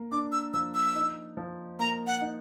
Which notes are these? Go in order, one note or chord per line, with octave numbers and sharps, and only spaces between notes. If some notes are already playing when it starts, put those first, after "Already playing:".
Already playing: A#3
D4 D6
E6
F3 E6
E6
D#4
F3
A#3 A#5
F#5
D#4